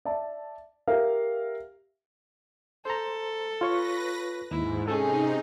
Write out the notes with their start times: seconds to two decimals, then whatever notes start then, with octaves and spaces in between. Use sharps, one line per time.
0.05 D5 E5 A5
0.87 G4 A#4 E5 F5
2.85 A4 C5 A#5
3.61 F4 B4 C#5 C#6 A#6
4.51 D#2 G#2 E4
4.88 C3 C#4 D#4 G#4 A4